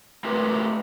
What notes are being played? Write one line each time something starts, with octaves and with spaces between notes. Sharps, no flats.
A3 F4 G4 A#4 B4